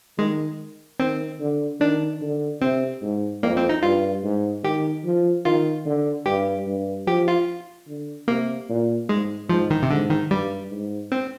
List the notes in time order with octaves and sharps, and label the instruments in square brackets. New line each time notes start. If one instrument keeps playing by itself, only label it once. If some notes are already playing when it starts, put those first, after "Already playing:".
[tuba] D#3 [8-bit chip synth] G#3
[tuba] D#3 [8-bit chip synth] C4
[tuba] D3
[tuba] D#3 [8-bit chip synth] D4
[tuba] D3
[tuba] C3 [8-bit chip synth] C4
[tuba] G#2
[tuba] F2 [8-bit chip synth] A#3
[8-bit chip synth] C4
D#4
[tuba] G2 [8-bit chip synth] F4
[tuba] G#2
[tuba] D#3 [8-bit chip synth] G4
[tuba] F3
[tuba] D#3 [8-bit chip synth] F4
[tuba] D3
[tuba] G2 [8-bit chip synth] G4
[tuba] G2
[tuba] F3 [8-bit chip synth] G4
[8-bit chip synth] F4
[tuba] D3
[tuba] C3 [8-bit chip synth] A#3
[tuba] A#2
[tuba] G#2 [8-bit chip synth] G#3
[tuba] G#2 [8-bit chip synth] F3
[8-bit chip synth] D#3
C3
[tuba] G#2 [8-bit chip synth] D3
[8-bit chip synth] D#3
[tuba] G2 [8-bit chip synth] G3
[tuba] G#2
[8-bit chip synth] C4